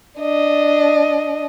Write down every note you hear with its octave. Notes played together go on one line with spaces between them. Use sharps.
D4 D#5